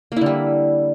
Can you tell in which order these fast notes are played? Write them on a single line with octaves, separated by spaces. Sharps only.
A#3 E4 D3 G3